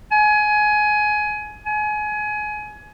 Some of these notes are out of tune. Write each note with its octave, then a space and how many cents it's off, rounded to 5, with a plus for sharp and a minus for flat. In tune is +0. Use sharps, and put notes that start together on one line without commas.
G#5 +20
G#5 +25